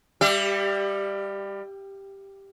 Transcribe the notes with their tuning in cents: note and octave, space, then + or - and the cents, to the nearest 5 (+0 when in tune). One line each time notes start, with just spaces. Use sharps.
G3 +25 G4 +0 E5 +40